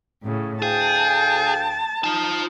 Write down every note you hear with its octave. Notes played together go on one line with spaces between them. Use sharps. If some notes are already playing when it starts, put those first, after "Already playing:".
A2 C#3
D2 G#4 F5 G5 A5
D#4 F4 A5